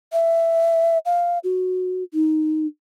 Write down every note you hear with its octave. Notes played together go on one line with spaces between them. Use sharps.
E5
F5
F#4
D#4